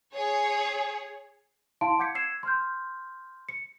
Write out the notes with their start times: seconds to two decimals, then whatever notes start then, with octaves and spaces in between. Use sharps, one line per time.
0.13 G#4 C#5
1.81 E4 F5 A5 C6 D7
1.99 F#5 D6 G6 G#6 B6 C#7
2.15 E6 G#6 C7 E7
2.43 C6 F6 G6
3.49 C#7